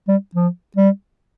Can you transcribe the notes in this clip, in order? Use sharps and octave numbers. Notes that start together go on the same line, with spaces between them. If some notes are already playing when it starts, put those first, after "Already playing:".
G3
F3
G3